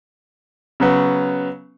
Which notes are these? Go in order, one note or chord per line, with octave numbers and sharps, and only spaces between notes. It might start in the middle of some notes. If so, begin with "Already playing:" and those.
C#3 F#3 B3